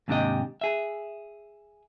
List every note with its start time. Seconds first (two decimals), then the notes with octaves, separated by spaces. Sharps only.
0.08 D#2 G#2 C3 D4 G4 D#5
0.61 G#4 E5